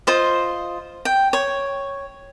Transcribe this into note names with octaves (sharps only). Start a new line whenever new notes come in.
F4 C5 D#5
G5
C#5